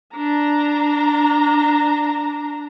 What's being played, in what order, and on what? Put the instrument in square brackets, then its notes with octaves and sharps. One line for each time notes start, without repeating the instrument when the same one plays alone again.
[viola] D4 A#5